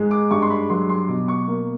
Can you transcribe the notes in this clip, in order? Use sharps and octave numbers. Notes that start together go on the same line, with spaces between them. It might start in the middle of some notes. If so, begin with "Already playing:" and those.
Already playing: G#2 G#3
D6
G2 C#6
C6
B5
F#3 C6
C6
B2 D6
C#6
A#3